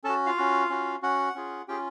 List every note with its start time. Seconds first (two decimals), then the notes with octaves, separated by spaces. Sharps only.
0.04 C#4 F#4 A4 A5
0.26 F4 F5
0.37 C#4 F#4
0.70 C#4 F#4
1.03 C#4 F#4 F#5
1.35 C#4 F4 G#4
1.68 C#4 F4 G4 G#4 G5